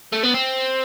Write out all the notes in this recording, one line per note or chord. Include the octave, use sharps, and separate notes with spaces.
A3
B3
C4